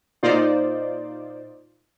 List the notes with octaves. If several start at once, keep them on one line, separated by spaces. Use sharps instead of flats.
A#2 D#4 F4 C5 D5